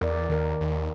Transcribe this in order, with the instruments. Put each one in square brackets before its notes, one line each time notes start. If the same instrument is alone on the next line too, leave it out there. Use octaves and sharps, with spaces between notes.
[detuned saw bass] E2 [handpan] A#4 D5
[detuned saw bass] E2
[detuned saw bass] D#2 [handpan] D#3 A#4
[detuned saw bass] D#2